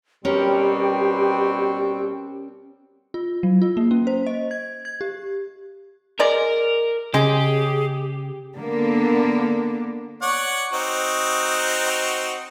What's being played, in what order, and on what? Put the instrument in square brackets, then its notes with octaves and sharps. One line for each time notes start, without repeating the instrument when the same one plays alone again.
[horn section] B2 G3 C4 [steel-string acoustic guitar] C#4 A#4 [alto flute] G4
[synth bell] F4
F#3
F4
A#3
C#4
C5
D#5
G#6
G#6
G4
[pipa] G#3 D5 [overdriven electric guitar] A#4
[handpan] C#3 C#4 [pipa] G#3 [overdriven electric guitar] G4 [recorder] G#4
[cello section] D3 A#3 B3 D4
[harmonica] C#5 D5 F#5
C4 D#4 F#4